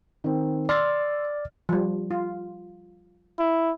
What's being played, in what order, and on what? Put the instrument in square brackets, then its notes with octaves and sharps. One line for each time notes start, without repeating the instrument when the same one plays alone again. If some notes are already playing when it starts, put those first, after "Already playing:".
[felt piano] D#3 C4
[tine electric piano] D5 A6 [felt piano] C6 E6 F6
[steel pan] F3 G3
F4
[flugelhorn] E4